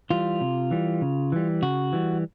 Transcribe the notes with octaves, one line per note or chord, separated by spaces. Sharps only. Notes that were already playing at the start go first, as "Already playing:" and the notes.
E3 G3 F4
C3
E3 G3
C#3
E3 G3
C#3 F#4
E3 G3